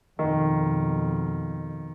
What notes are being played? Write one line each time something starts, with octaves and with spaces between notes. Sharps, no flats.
F2 B2 D#3